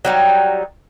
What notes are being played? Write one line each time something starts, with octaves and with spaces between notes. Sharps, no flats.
F#3 G3 D#4